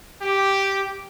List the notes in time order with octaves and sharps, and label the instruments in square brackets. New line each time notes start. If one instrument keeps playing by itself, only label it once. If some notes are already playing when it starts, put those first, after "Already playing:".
[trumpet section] G4